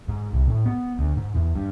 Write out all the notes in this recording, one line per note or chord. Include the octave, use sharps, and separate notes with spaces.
G#2
C2
A2
B3
D2
G#2
E2
G2